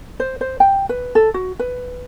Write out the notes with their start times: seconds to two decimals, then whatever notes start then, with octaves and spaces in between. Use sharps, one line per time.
0.20 C5
0.41 C5
0.60 G5
0.89 B4
1.15 A4
1.34 F#4
1.59 B4